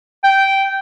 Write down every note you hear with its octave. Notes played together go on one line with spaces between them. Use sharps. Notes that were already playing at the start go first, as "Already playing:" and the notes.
G5